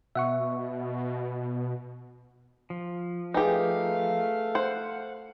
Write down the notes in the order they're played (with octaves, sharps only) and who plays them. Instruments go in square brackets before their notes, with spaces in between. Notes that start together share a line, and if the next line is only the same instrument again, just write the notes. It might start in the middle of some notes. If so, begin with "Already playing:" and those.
[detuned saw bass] B2 [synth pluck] E5 F#5 C#6
[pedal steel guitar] F3
[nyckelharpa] A3 F5 [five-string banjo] D#4 G4 [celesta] G#4 B4 G#5
[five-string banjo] C5 [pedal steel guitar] F#5